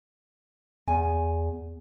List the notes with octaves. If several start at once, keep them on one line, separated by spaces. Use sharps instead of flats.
E2 G#5